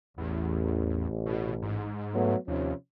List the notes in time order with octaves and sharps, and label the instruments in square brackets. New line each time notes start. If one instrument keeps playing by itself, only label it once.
[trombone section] A1 [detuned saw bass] E2
[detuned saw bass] B2
G#2
[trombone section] F#3 A3 B3
[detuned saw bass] D#2 [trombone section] C3 F3 C#4